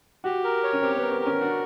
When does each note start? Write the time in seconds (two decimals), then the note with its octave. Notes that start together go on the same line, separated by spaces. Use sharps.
0.24 F#4 G4
0.44 A#4
0.63 C#5
0.73 C#4
0.82 C4 G4
0.96 B3
1.02 A#4
1.11 C4
1.21 C#4 A#4
1.41 D4 F#4